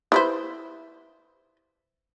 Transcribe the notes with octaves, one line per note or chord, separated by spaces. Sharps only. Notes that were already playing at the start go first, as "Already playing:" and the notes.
E4 B4 C5